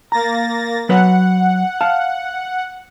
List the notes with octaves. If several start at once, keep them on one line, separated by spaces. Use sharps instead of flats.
A#3 A#5 A6 A#6
F#3 B4 C#5 F#5
F5 A5